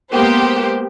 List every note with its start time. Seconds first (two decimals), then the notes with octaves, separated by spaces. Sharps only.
0.12 G#3 A#3 B3 G4 C5